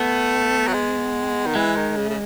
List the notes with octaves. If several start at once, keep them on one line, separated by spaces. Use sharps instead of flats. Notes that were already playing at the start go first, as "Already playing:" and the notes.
Already playing: A3 B3
F#3
G#3
D#3
E3 G#3
D#3
C#3
C#3